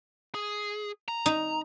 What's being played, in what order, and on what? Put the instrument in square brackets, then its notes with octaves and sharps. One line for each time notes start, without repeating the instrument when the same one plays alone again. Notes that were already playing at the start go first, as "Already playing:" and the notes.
[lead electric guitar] G#4
A#5
[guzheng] D#4